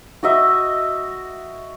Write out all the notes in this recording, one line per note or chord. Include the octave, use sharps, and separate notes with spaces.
F#4 D#5 E5